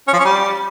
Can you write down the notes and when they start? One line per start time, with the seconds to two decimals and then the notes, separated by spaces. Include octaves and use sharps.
0.08 C#4
0.13 F3
0.19 C#4
0.25 G3